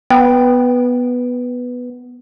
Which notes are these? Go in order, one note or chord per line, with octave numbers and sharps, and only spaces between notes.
B3 G5